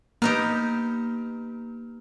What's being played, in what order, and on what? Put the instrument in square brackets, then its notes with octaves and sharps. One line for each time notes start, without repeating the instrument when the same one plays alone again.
[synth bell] A#3 [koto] B3 D#4 G4